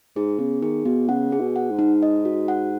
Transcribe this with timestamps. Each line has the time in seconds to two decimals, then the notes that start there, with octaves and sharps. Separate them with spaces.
0.16 G#2 G#4
0.39 C#3 B3
0.62 D#3 G#4
0.86 B2 B3
1.09 C#3 F#5
1.32 G#4
1.40 B2
1.56 F#5
1.71 G#2
1.79 D#4
2.02 D#5
2.25 F#4
2.48 F#5